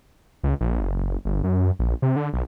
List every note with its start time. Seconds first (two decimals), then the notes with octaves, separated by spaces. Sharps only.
0.43 C#2
0.61 A#1
0.81 F#1
1.25 G1
1.44 F#2
1.79 A#1
2.02 C3
2.16 D3
2.33 B1